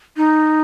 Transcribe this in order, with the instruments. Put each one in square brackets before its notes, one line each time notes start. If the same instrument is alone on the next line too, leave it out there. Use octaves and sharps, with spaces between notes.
[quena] D#4